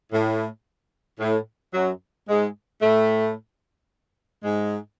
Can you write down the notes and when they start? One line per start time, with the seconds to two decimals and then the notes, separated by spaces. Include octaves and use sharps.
0.12 A2
1.20 A2
1.74 F#2 F#3
2.28 G#2 G#3
2.82 A2 A3
4.44 G#2 G#3